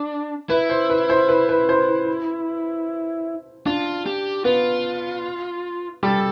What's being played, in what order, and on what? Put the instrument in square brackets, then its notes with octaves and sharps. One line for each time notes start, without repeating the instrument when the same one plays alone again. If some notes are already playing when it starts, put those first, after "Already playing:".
Already playing: [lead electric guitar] D4
[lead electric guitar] E4 [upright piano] B4
[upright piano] C5
B4
C5
B4
B4
C5
[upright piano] D4 [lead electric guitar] F4
[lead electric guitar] G4
[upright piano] B3 [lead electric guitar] F4
[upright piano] G3 [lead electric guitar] A4